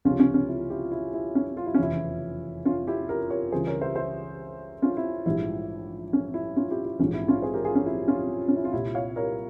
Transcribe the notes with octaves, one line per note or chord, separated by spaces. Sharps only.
C#2 C3 F3 G#3 C#4 F4
C#4
C#4
E4
E4 G4
E4
E4
C#4
F4
E4
C#4
F1 E2 C#3 E3 E4
C#4 F4
E4 G4
G4 A#4
A#4 C#5
C#2 C#3 E3 G3 G#4 C5
A#4 C#5
C5 E5
C5 E5
C#4 F4
E4
A#1 G#2 E3 G3 E4
C#4
E4
C#4 F4
E4 G4
E4
A#1 G#2 E3 C#4
E4
C#4 F4
G#4 C5
G4 A#4
F4 G#4
C#4
E4
C#4 F4
C#4
E4
F4
C2 A#2 G3 E4 G4
C#5 F5
A#4 C#5